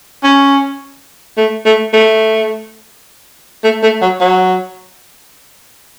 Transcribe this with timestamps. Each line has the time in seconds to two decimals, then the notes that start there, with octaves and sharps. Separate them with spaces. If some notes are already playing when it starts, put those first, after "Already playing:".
0.24 C#4
1.37 A3
1.65 A3
1.93 A3
3.64 A3
3.83 A3
4.02 F#3
4.21 F#3